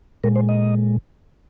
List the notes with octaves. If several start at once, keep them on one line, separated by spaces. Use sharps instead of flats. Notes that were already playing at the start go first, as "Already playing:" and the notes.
A#2 G#3 A#4
C5
D#5